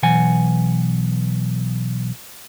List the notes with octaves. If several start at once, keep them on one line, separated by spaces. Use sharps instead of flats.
B1 E3 F#5 G#5